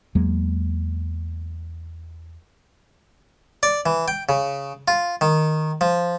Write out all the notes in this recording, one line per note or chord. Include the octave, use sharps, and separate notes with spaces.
E2 F#3 G#3 A#3
D5
E3
G5
C#3
F4
D#3
F3